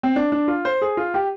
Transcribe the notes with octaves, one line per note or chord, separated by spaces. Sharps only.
C4
D4
D4
F4
C5
G#4
F4
G4